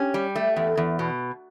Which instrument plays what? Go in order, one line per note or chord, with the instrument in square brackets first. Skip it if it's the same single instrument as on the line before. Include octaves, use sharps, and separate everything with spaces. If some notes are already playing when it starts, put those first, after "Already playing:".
Already playing: [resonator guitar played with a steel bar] C#4 [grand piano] G4
[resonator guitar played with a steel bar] G3
A3
E2
E2
B2